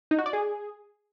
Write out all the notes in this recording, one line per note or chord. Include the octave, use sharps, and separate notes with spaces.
D#4
F#4
D5
G#4